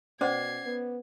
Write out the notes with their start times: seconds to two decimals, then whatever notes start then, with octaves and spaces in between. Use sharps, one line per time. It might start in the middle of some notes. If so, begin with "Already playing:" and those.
0.21 B2 C#4 C5 D5 F#5 G#6 C7
0.65 B3